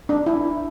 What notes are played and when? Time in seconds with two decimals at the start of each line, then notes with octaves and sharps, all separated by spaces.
0.09 D4
0.26 E4